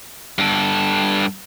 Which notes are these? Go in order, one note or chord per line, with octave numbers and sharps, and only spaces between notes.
G2 A4